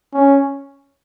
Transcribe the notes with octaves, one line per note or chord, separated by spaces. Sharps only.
C#4